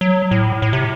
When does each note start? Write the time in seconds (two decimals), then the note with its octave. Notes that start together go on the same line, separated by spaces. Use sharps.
0.01 F#3
0.31 A2
0.62 A2
0.73 C3